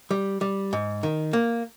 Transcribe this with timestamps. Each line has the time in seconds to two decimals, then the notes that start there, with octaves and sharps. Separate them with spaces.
0.11 G3
0.41 G3
0.73 G#2
1.03 D#3
1.33 A#3